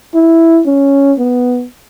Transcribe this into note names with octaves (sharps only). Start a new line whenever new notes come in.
E4
C#4
B3